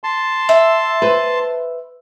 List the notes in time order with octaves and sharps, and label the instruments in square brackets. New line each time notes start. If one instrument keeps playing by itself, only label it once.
[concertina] A5 C6
[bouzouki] E5
[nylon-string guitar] B4 C5